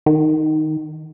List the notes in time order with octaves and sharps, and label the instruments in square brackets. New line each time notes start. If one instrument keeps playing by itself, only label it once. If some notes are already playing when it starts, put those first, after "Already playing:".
[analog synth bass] D#3